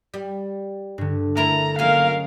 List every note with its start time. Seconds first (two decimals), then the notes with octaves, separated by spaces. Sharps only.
0.14 G3
0.98 G2 D3
1.37 A3 E4 A#4 A#5
1.79 F#3 G#3 A#3 C#4 F4 A#4 F5